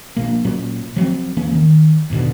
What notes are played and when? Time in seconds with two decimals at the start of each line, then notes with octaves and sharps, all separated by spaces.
0.17 A#1 A#2 A#3
0.45 A#2 F#3 C#4
0.96 F3 F#3 B3 C4
1.36 E1 E3 A#3 C#4
1.55 D#3
2.10 E1 G#2 B2 D3